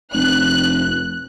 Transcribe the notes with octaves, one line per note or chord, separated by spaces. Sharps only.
F1 F#6